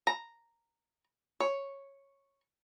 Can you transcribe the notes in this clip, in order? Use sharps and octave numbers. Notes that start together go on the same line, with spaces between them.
A#5
C#5